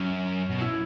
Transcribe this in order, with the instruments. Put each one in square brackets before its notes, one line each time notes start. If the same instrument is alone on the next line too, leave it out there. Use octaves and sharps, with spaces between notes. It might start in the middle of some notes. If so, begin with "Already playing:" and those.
Already playing: [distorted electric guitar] F#2 [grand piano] C#4
[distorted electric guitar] B2
[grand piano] E4